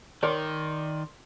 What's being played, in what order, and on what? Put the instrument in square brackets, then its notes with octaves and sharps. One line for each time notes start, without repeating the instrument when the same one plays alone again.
[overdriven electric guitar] D#3 [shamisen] A#4 C#5 [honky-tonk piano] D5 C6